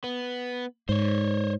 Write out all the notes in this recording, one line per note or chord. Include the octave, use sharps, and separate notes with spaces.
B3
G#2 C5 C#5